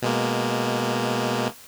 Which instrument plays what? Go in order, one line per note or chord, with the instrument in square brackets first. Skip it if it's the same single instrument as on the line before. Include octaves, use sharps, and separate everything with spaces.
[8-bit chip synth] B2 G#3 A#3